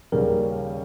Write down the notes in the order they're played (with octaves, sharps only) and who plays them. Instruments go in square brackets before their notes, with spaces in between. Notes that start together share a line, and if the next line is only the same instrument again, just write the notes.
[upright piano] D#2 C#3 G3 C#4 G#4 [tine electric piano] A#4